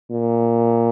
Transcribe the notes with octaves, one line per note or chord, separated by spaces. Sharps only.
A#2